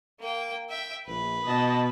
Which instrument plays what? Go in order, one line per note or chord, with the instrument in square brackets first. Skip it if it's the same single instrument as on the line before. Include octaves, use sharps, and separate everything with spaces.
[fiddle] A#3 G5
E5 G5
[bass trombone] A#1 [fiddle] B4
[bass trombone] B2 [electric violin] D#5 A5